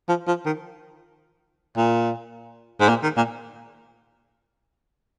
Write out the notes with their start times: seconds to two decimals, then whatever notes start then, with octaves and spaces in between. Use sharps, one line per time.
0.09 F3
0.27 F3
0.46 D#3
1.77 A#2
2.80 G#2
2.89 A#2
3.03 D#3
3.17 A#2